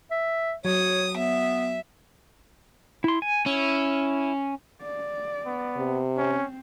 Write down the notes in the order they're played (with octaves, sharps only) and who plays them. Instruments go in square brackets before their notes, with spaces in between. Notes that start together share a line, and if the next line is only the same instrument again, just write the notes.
[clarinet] E5
[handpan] F#3 [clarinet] C#5 [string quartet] D#6
[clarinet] B3 [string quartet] E5
[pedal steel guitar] E4 C6
G#5
[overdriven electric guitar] C#4 [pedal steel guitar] E4
[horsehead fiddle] D5
[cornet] B3
[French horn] C3
[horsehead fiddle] C4 [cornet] C#4